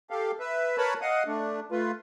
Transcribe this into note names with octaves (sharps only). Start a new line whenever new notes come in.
G4 A4 F5
B4 E5
A#4 B4 C#5 A5 B5
D#5 F5 F#5 D#6
A3 D4
A3 F4 B4